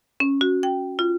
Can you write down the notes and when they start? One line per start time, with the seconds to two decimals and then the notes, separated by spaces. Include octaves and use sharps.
0.20 C#4
0.41 F#4
0.63 G5
0.99 F4